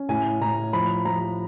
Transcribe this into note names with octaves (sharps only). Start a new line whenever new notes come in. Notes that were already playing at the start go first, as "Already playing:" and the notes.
Already playing: C#4
A2 G#5
A2 A#5
F3 B5
F3 A#5